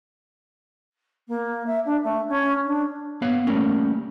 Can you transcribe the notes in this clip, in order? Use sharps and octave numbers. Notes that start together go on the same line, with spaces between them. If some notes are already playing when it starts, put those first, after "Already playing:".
A#3
E5
D4
A3
C#4
D4
B3 C#5 F5
G3 A3 A#3 C#4